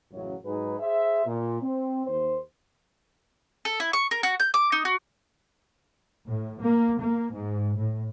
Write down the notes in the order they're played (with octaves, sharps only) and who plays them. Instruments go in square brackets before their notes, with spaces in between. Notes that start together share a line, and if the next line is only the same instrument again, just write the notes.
[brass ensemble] A1 F#2 C#3 F#3
G#2 F#3 D#4 G#4 B4 G#5
G#4 C5 E5
A#2
C4
D#2 C5
[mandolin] A4
E4
C#6
A#4
F#4
G6
D6
D#4
F#4
[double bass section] A2
A#3
A#3
G#2
A2